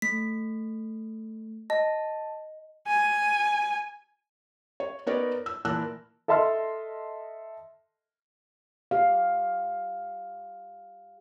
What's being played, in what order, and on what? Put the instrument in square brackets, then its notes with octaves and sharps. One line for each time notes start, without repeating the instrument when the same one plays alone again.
[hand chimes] A3 [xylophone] B6
[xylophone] D#5 [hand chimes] A5
[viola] G#5
[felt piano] C#5
B3 D#4 A#4 B4 C#5 D5
E6
A#2 E3 A#4 A5 E6 F#6
[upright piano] A4 D#5 E5 A5 C6 F6
[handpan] G4 F5